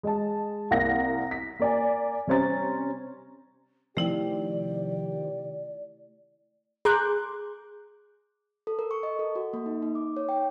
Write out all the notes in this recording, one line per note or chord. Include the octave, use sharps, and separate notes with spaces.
G#3 D#5 A5
C2 A#3 F5 F#5 A#6
B6
A#3 D5 G#5
C3 G3 C#4 C5 A#5 A6
C3 D#3 F3 A3 E4 G4 D5 G5
G#4 A#5 C6 D6 F#6 G6
A4
A#4
C#6
D#5
A4
F#4
A#3
D#4
D#4
D6
C#5
G5